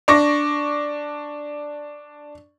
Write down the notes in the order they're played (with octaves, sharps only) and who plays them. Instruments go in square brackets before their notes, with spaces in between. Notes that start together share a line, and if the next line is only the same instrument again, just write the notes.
[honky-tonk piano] D4 C#6 D6 A#6